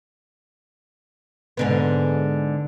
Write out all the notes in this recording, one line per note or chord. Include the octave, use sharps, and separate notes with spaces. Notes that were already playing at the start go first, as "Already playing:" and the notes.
G#2 D3 B3